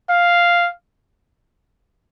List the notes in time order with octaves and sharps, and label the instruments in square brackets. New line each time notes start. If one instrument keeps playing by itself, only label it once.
[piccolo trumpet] F5